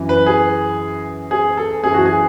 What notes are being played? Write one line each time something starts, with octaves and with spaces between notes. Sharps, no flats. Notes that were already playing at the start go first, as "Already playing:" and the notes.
Already playing: F#2 E3
B4
G#4
G#4
A4
F#2 E3 G#4
F#4
G#4